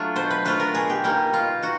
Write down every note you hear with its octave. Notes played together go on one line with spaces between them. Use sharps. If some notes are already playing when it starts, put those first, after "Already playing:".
Already playing: F#3 A3 D4 F4
B2 C5
B4
F#3 A3 D4 F4 B4
A#4
B2 G#4
G4
G3 A#3 D#4 G4
B2 F4
D#4 F#4